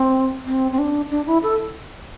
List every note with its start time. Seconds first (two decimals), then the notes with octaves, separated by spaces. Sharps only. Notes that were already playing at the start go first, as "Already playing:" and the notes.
Already playing: C4
0.45 C4
0.72 C4
0.79 D4
1.10 D4
1.27 E4
1.43 A4